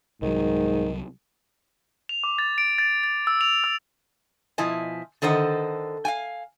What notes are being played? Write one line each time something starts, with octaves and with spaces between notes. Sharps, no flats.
C2 G#2 D#3 F#3
F7
D6
A6
D7
A6
A6
E6
F7
E6
B2 F3 E4 D#5 G#5
D3 D#3 A4 C5 D#5 F#5
F5 G5 G#5